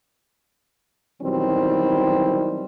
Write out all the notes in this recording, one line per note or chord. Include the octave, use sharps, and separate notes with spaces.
B2 D#3 E3 F#3 G3 C4